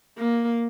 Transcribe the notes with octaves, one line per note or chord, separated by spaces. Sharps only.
A#3